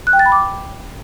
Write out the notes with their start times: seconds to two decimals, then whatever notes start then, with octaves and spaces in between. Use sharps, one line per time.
0.07 F#6
0.13 G5
0.19 A6
0.26 B5
0.32 D6